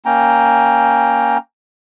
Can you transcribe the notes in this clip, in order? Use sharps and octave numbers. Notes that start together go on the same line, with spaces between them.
A#3 C#4 G5 A#5